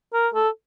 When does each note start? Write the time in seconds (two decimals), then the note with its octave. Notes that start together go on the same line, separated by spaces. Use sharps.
0.13 A#4
0.34 A4